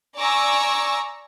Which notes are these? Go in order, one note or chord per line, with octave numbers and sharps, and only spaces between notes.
D5 G#5 A#5 C#6 D6 E6